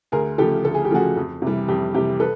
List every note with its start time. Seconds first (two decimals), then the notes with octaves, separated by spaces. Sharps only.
0.12 D2 G#4 A#4
0.38 C#3 F3 A3 G4 A4
0.65 D2 A4
0.75 G#4
0.85 G4
0.91 C#3 F3 A3 F#4 G#4
1.16 F2
1.42 C3 E3 G3
1.68 F2 G4
1.94 C3 E3 G3 G4
2.20 A4 B4